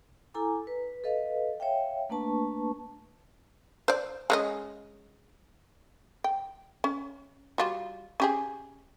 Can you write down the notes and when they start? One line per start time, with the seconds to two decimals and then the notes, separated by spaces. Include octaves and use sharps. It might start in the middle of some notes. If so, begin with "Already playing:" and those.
0.34 E4 A4 G#5 A#5 D6
0.67 B4
1.04 A4 B4 D#5 F5
1.60 C#5 E5 F5 G5
2.09 A3 A#3 D4 B4 A5 C#6
3.88 C5 D5
4.30 G#3 C#4 D#5
6.24 G5
6.84 C#4
7.58 G3 F4 F#4
8.20 C#4 G4 G#4